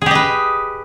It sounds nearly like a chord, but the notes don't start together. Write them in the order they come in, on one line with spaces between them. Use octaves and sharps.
G#4 G4 D#5 B4